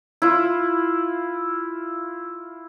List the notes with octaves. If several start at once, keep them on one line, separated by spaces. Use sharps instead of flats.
E4 F4